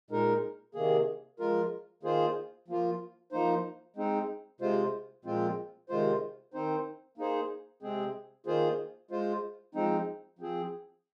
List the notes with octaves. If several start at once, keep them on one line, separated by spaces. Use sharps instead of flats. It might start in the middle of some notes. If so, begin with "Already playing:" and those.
A#2 G#3 D#4 A#4
C3 D#3 A#3 G#4
F3 G#3 F4 A#4
D#3 A#3 F4 G#4 C5
F3 A#3 F4
F3 A#3 D#4 C5
G#3 C4 D#4
C3 G#3 F4 C5
A#2 F3 G#3 C4 F4
C3 D#3 G#3 F4 C5
D#3 C4 D#4 C5
A#3 D#4 G#4 C5
C3 G#3 C4 G#4
D#3 A#3 F4 G#4 C5
G#3 F4 C5
F3 G#3 C4 D#4
F3 C4 G#4